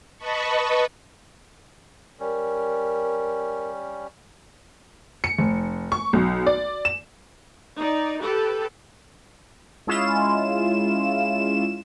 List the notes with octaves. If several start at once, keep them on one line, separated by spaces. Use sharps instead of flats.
B4 D#5 A5 B5 C#6
G3 C#4 A#4
C#7
F1
C#6
B1
D5
E7
D#4 D5
G4 A4 B4
G#3 C#4 E4 F4 E7